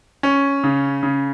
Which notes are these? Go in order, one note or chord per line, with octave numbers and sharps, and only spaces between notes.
C#4
C#3
C#3